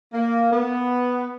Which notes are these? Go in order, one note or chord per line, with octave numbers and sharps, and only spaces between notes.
A#3
B3